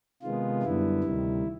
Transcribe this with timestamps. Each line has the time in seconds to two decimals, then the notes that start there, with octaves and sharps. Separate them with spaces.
0.22 C3 D#3 G#3 B3 F4
0.63 F#2 D3 G3 B3 E4
1.03 D2 C3 D#3 G3